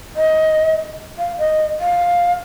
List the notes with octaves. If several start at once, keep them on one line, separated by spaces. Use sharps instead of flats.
D#5
F5
D#5
F5